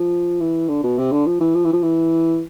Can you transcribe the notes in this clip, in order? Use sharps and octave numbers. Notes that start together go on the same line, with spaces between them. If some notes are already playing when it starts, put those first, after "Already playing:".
Already playing: F3
E3
D3
B2
C3
D3
F3
E3
F3
E3
F3
E3